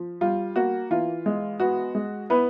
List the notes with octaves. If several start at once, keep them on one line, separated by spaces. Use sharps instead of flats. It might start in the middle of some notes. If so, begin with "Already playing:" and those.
Already playing: F3
G3 F4
A#3 F#4
E3 F4
G#3
B3 F#4
G#3
B3 E4 B4